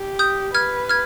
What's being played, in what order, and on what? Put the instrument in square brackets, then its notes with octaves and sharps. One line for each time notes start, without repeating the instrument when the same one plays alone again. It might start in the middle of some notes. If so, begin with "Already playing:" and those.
Already playing: [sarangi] G4
[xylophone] D#6 G6
[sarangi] B4 [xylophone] F6 G#6
[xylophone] F6 G#6